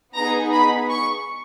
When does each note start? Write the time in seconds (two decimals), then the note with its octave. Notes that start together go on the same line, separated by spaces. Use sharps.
0.15 B3 D#4 G#4 A#5
0.52 B5
0.90 C#6